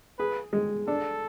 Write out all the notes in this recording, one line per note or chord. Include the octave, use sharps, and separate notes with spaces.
G#4 B4
G#3
D4 A4